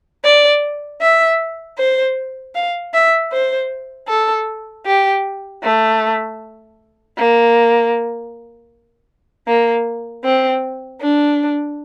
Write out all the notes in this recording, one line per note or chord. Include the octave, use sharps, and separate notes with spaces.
D5
E5
C5
F5
E5
C5
A4
G4
A3
A#3
A#3
C4
D4